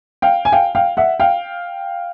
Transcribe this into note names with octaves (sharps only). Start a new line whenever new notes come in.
F5 G5
G#5
F5 G5
F5 G5
E5 F#5
F5 G5